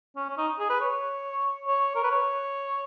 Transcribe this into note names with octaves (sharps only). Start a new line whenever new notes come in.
C#4
C#4
D#4
G#4
B4
C#5
C#5
A#4
B4
C#5